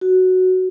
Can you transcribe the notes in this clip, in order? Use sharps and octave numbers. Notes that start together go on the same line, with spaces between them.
F#4